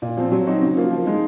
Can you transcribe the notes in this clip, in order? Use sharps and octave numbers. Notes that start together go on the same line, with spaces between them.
A#2
F3 C4
F#3
C4 D#4 F#4
C#3
F3 A#3 F4
F3
G#3 D#4